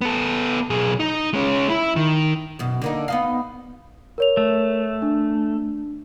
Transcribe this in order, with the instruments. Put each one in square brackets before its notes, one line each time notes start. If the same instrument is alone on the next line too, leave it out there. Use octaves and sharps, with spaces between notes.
[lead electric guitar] B3 A4
B1 G#4
D#4
G#3 C#4
E4
D#3
[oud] F#2 B2
D3 A#3 D#4
B3 D#4 F5
[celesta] A#4 C#5 F7
[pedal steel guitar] A3
[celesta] D4